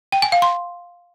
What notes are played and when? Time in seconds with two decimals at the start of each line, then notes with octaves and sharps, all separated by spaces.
0.12 G5
0.22 G#5
0.32 F5
0.42 C6